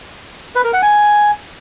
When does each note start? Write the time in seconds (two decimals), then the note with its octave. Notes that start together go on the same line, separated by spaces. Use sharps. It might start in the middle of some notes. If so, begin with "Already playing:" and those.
0.55 B4
0.64 A#4
0.73 F#5
0.82 G#5